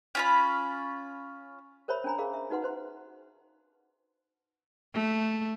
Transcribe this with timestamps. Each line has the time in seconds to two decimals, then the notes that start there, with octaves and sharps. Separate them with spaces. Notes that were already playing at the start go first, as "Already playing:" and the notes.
0.15 C#4 F4 B5
1.88 A#4 C5 C#5 E5 B5
2.04 C#4 D4 G#5 A#5 B5
2.18 G#4 A#4 D#5 F5
2.34 E5
2.50 D#4 F#4 B4 F#5 C6
2.62 B4 C5 C6
4.95 A3